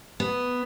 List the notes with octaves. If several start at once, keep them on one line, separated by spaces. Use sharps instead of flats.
B3